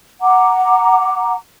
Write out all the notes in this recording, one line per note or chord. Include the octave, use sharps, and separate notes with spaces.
F#5 A#5 D6